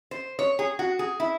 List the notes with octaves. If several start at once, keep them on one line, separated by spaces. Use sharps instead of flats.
C5
C#5
G#4
F#4
G#4
E4